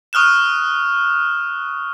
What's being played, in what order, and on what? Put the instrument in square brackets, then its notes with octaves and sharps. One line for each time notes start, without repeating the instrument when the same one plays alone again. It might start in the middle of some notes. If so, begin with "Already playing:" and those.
[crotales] C#6 D#6 F6 F#6 E7